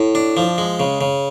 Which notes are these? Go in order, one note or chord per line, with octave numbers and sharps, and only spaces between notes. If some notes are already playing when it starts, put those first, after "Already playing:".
Already playing: A2
D4
F3
G#3
C#3
C#3